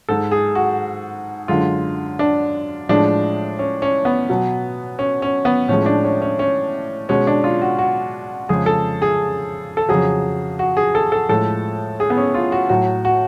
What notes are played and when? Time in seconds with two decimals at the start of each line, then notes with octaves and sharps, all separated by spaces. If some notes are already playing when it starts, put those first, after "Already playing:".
0.09 G#2 G#3 A4
0.32 G#4
0.55 F#4
1.48 F#2 D3 G#3 F4
2.19 D4
2.89 A2 F3 G#3 D4
3.59 C#4
3.82 C#4
4.05 B3
4.29 B2 F#3
4.99 C#4
5.22 C#4
5.45 B3
5.68 A2 F3 G#3 C#4
5.86 D4
6.05 C#4
6.22 C#4
6.39 C#4
7.09 B2 G#3 C#4
7.27 D4
7.44 F4
7.62 F#4
7.78 F#4
8.49 F2 C#3 G#3 G#4
8.66 A4
9.02 G#4
9.77 A4
9.89 F2 C#3 F#3 G#4
10.59 F#4
10.77 G#4
10.95 A4
11.12 A4
11.29 A2 F3 G#3 A4
12.00 G#4
12.10 B3
12.17 C#4
12.34 F4
12.52 F#4
12.69 A2 F#3 F#4
13.05 F#4